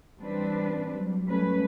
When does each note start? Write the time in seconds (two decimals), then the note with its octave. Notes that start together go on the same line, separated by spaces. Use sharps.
0.19 E3 G3 C4 D4 B4
0.92 F#3 G3
1.25 F#3 G3 A3 C#4 B4